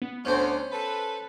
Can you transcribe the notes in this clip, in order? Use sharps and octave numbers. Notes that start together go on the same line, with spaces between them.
B3
D2 C#4 C5
A4 B4